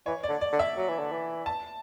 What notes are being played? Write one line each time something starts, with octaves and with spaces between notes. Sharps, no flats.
E3 C#5
D5
D3
D5
D3
E5
F#3
E3
D3
E3
A5